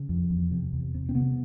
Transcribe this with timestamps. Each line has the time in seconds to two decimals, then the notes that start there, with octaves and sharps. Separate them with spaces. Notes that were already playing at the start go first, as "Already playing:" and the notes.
Already playing: C#3
0.09 F2
0.30 E2
0.51 C3
0.73 E2
0.94 C3
1.09 C4
1.15 C3 B3